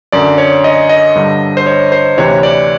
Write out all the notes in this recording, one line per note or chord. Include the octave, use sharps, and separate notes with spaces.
F#2 D3 D5
C#5
D#5
D#5
G2 D3
C5
C#5
C5
D2 C3 E3 C#5
D5